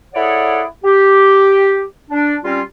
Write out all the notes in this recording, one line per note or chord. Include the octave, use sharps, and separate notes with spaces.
E4 G#4 A4 C#5 D5 F#5
G4
D4
G3 C4 C#4 F4